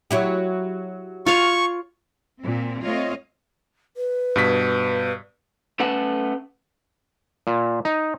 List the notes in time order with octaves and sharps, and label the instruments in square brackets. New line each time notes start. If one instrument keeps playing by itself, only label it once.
[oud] F#3 E4 G4
[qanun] F4 C#5 F5 [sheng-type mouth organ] C#6
[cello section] A#2 C4
A3 C4 F4 C#5 D#5 F5
[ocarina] B4
[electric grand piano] G2 B2 B6
[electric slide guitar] A3 C#4 A4 B4 F#5 A5
[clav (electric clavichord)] A#2
D#4